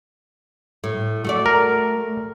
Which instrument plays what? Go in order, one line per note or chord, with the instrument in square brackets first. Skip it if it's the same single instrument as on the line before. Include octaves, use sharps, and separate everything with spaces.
[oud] A2
A3 F#4 D5
[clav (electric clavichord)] A#4